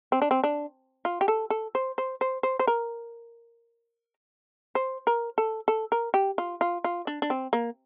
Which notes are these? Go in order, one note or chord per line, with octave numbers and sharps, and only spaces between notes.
C4
D4
C4
D4
F4
G4
A4
A4
C5
C5
C5
C5
C5
A#4
C5
A#4
A4
A4
A#4
G4
F4
F4
F4
D4
D4
C4
A#3